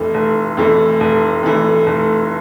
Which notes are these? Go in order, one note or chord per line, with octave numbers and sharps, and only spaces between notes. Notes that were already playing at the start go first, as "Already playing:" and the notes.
Already playing: F1 F2 E3 A3
F1
F2 E3 A3
F1
F2 E3 A3
F1